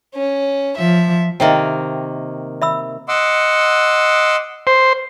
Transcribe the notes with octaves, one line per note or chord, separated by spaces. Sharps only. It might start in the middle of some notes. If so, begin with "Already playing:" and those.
C#4
F3 E5
C3 D#3 A#3 D#5 E5 G5
E5 B5 E6
D#5 F#5 C6 D6 E6
C5